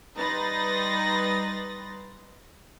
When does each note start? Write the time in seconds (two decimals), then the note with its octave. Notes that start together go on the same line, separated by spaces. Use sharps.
0.16 G3 D#4 B4 C6 A6 A#6